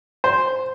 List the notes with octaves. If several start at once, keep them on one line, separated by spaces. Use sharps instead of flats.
C5